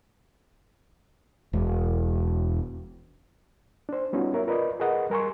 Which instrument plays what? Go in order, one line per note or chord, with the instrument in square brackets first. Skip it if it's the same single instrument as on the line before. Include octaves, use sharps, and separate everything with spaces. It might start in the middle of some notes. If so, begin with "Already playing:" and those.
[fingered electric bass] E1
[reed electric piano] D4 C5
G3 B3 C#4 D#4 F4 F#4
A#4 C#5 E5
F4 A#4 B4 D5 D#5
G#4 A#4 B4 D#5 F#5
G3 A#4 G#5 C6 C#6